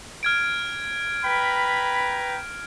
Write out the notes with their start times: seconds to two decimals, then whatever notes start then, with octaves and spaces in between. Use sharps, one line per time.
0.23 F6 G#6 D7
1.24 B4 G5 A#5 B5